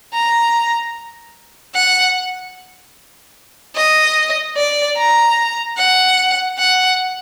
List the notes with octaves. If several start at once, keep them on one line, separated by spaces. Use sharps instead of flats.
A#5
F#5
D#5
D5
A#5
F#5
F#5